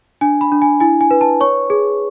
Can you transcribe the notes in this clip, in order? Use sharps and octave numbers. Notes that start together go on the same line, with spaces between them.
D4 G#5
B5
D4
G#5
E4 G#5
G#5
B4
A5
C#5 C#6
G#4